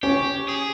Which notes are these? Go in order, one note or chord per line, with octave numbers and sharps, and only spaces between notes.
C#4 G4
G#4